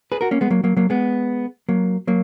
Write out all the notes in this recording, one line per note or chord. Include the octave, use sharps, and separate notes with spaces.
G#4 B4
F#4 A#4
A#3 C#4
G#3 B3
F#3 A#3
F#3 A#3
F#3 A#3
G#3 B3
F#3 A#3
F#3 A#3